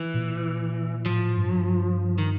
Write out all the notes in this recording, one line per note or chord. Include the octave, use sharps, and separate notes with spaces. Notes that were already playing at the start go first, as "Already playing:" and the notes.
Already playing: E3
A#2
A2 F3
G2
D#3